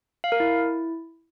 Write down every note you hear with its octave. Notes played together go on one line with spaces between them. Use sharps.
F5
A#4
E4